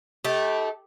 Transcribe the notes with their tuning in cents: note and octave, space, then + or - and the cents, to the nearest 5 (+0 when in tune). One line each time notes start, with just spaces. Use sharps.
A3 -15 D#4 +45 G4 +0